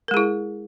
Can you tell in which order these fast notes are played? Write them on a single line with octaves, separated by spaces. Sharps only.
A#4 G#3 G#4 E4